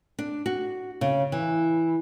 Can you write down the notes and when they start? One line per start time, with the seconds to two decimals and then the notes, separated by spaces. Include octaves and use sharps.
0.19 D4
0.46 F#4
1.01 C#3
1.32 E3